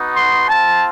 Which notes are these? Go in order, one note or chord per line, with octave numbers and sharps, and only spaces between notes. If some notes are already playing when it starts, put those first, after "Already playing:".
Already playing: B3 D#4 F#4
C6
C4 F4 A5